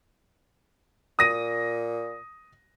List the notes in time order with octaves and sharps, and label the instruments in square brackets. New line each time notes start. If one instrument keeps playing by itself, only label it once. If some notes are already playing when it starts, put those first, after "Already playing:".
[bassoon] A#2 [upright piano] D#6 A#6 D#7